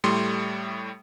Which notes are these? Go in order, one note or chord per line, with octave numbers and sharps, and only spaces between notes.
A2 G3 A3 C6